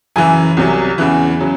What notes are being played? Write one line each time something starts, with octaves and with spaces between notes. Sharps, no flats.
F#2 C#3 E3 G#5
C2 C3 F#3
E2 C#3 E3
C#3 F#3